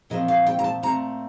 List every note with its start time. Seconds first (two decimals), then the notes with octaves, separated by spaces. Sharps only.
0.10 A#2 F3 A3 C4 D#5
0.28 F5
0.46 G5
0.59 A#5
0.64 A5
0.83 A#2 A3 C4 A#5